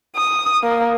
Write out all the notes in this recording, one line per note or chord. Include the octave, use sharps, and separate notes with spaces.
D#6
A#3